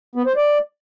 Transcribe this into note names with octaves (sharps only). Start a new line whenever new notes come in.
B3
C5
D5